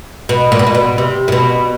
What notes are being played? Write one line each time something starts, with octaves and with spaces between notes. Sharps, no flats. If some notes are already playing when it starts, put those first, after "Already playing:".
B2
A#2
B2
A#2
B2
C3
A#2
B2